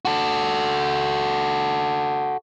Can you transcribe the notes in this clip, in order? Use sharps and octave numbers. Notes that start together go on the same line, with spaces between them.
F#4 A4